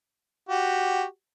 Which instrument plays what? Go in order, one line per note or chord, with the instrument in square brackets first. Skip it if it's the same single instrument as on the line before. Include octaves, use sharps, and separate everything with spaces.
[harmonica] F#4 G4